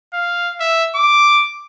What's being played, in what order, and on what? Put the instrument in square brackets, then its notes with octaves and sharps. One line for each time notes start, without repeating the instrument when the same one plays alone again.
[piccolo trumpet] F5
E5
D6